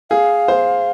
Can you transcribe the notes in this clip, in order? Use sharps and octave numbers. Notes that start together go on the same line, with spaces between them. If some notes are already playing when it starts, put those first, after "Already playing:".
G#4 F5
C5